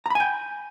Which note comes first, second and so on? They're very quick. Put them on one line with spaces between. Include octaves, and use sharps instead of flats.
A#5 B5 G#5 G5